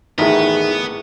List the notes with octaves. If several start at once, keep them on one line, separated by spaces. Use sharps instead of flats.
A1 E2 A2 D#3 B3 D#4 G#4 B4